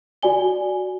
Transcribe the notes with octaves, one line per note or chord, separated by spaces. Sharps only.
F#4 D5 G#5 G7